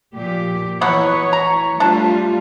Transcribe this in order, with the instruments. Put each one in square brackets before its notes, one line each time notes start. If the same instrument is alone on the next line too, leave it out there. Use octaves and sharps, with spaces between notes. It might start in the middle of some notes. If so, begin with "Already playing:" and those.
[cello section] A#2 F3 G4
[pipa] B2 F#3 B3 [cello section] E3 C#5
[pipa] A#5
[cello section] G3 A3 F4 [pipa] D4 A5